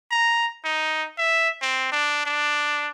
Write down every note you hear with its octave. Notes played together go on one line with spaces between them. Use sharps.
A#5
D#4
E5
C4
D4
D4